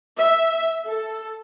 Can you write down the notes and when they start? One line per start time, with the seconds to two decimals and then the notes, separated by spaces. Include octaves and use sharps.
0.17 E5
0.86 A4